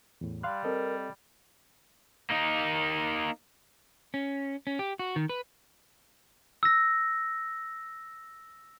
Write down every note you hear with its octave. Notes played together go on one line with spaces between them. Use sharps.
E2 A2
G3 F5 C6 F#6
C4 A4 A#4 D#5
A#3 D#4
C#4
C#4
G4
F#4
D#3
B4
E6 A#6